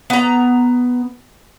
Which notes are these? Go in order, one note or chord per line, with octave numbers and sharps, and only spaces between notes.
B3 A#5